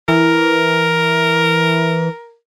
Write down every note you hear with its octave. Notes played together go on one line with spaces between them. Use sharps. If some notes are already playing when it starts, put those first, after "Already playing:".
E3 A#4